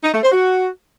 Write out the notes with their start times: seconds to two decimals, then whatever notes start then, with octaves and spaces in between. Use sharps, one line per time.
0.03 D#4
0.12 A3
0.22 C5
0.32 F#4